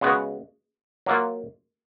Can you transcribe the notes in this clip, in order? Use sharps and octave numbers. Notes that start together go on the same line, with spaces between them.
C#3 G#3 B3 F#4
F#3 A#3 F4